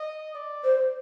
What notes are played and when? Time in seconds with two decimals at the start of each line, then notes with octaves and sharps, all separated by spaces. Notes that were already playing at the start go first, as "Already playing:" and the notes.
Already playing: D#5
0.35 D5
0.64 C5